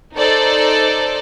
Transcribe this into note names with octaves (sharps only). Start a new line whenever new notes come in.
D#4 A4 C5 D5